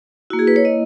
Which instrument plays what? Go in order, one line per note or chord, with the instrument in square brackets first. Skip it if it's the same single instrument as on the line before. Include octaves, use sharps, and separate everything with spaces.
[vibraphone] E4 F#4
A#3
G#4
B4
C#5
D#5